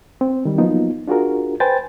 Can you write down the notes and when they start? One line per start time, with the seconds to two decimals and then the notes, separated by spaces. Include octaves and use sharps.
0.21 C4
0.45 D#3 G3
0.58 F3 F#3 A#3 B3 D#4 F4
1.08 D4 F4 F#4 G#4 A#4
1.60 B4 C5 G5 G#5 A6